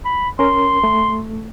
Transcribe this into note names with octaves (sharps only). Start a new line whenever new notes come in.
B5
C#4 A#4 C6
A3